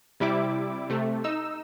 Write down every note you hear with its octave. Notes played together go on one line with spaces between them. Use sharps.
C3 G3 E4 D6
C3 A3
D#4 E6